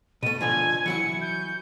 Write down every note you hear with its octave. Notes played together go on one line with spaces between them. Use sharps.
B2 A3 D#7
B2 D3 F3 G#5
E3 F#3 E4 C#7
G6